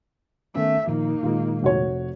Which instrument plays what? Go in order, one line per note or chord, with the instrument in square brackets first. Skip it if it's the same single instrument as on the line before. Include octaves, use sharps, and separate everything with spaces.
[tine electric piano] D#3 B3 C#4 [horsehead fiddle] A3 E5
[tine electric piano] A#2 D#3 F3 [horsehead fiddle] A#3 D#4
[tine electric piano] A#2 D#3 G#3 [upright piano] F4
[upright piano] F1 F#4 C#5